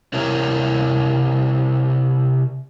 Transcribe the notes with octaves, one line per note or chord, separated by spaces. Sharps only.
C3 C4 E4 A#4 C#5